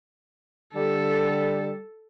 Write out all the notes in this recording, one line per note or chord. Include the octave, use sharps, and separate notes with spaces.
D3 G3 A4